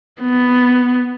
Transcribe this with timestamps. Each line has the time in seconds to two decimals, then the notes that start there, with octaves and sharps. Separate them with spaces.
0.21 B3